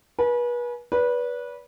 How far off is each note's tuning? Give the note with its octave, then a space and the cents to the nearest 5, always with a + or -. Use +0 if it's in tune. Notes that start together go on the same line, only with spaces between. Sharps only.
B4 -35 G#5 +30
B4 -20 D5 -40